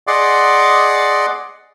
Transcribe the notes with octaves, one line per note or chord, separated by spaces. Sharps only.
G#4 D5 D#5 F#5 C6 D6